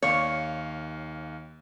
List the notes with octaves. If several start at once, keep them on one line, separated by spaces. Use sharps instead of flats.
D#2 C#5 F5